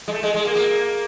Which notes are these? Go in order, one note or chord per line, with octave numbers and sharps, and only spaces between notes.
G#3
A3
G#3
G#3
A#3
A#3